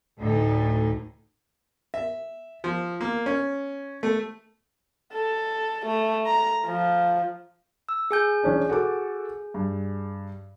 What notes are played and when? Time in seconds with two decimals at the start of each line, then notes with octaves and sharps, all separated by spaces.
0.19 D2 A2 D#4 A4
1.94 E5
2.64 F3
3.01 A#3
3.26 C#4
4.03 A3
5.13 A4
5.87 A3
6.26 A#5
6.66 F3
7.89 E6
8.11 G#4 G#5 G6
8.43 E3 C#4 D4
8.69 F#4 A4 D6
9.54 G2